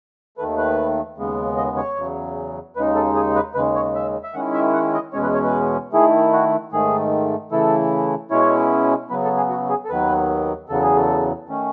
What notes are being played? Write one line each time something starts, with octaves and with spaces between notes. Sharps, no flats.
D#2 D#3 A3 B4
B4
D#2 C#3 G#3 B3
D#5
C#5
E2 C#3 F#3
D#2 C#3 G#3 D#4 B4
A4
G#4
B4
D#2 C#3 G#3 B4
C#5
E5
E5
D#3 G#3 C#4 E4 F#5
E5
F#5
D#5
E2 B2 G#3 C#4 C#5
B4
C#5
B4
D#3 A3 E4 G#4
F#4
G#2 D#3 A3 G#4
C#3 E3 A3 E4 A4
B2 G#3 C#4 E4 C#5
C#3 F#3 B3 B4
A4
G#4
F#4
G#4
A4
D#2 D#3 F#3 B3 B4
E2 C#3 F#3 B3 A4
G#4
A4
D#3 A3 C#4